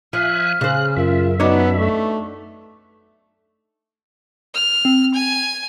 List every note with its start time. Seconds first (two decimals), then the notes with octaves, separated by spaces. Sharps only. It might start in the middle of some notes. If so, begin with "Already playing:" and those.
0.13 F3 E5 G#5 F6 F#6
0.61 C#3 C5 F#6
0.97 F#2 F4 A#4 E5
1.40 B3 D4 D#4 F#4 C#5
1.79 A3 C#6
4.55 F6
4.85 C4
5.14 G#5